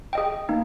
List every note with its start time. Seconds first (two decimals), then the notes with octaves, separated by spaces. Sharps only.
0.13 G#4 D#5 G5
0.49 A#3 D#4